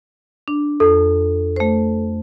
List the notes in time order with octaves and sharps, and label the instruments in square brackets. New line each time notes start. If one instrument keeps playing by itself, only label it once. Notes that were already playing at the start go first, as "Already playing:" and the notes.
[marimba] D4
[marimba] F2 [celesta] A4
[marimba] A3 C5